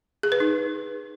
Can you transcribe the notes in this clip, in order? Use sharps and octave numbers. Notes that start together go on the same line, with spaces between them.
G#4
B4
D#4